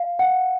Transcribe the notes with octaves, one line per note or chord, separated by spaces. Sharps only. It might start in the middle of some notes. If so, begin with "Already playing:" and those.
Already playing: F5
F#5